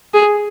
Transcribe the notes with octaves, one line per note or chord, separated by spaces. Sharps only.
G#4